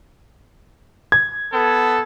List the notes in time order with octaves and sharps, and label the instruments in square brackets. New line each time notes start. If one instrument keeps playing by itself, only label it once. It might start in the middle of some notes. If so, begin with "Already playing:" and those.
[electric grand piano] G#6
[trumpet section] B3 A4